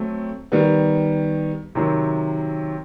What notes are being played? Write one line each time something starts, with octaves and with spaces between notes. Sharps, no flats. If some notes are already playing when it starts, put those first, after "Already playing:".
Already playing: F#3 A3 C4
D#3 G3 B3
C3 D#3 F#3